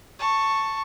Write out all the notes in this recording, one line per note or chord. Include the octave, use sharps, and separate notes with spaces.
A5 C#6